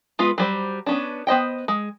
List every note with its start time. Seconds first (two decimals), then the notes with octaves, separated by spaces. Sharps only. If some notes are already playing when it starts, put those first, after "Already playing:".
0.19 G#3 B3 F4 B4
0.38 F#3 G3 C5
0.86 B3 C#4 D4
1.27 B3 C5 D#5 G5
1.68 G#3